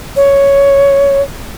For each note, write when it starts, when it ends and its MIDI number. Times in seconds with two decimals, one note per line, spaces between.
0.16 1.21 73